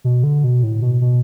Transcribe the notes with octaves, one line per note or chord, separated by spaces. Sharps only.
B2
D3
B2
A2
B2
B2